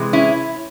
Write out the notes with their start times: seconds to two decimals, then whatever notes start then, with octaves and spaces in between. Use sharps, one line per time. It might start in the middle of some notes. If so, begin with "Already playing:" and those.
Already playing: C3 E3 G#3
0.13 C#4 E4